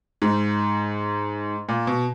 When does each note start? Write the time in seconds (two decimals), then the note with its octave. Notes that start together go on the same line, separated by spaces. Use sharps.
0.22 G#2
1.69 A#2
1.87 B2